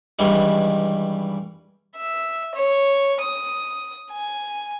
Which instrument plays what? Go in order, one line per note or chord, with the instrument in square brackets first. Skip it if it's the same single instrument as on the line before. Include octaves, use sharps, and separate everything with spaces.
[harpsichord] G2 D#3 E3 G3 G#3
[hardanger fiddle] E5
C#5
D#6
G#5